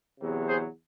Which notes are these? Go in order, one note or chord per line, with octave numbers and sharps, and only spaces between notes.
E2 C3 F#3
G#4 C5